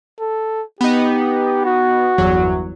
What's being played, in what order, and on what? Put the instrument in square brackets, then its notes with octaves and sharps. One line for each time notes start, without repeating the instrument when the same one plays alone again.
[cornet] A4
[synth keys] B3 D#4 [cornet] G4
[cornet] F#4
[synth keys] G1 E2 F#3